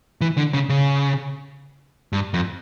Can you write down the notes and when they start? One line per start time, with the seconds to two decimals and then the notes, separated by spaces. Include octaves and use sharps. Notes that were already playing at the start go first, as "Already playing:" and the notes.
0.21 E3
0.38 D3
0.54 C#3
0.69 C#3
2.13 G2
2.34 F2